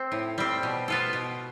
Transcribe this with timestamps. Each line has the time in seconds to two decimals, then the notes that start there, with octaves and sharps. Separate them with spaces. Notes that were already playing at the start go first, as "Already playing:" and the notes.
Already playing: C4
0.12 A2
0.38 G3 C4
0.63 B2
0.88 B3 F4 A4
1.13 B2